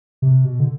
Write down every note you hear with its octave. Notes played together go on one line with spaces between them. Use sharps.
C3
B2
D3